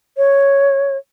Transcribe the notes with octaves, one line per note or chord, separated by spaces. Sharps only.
C#5